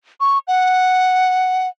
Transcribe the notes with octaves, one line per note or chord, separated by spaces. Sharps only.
C#6
F#5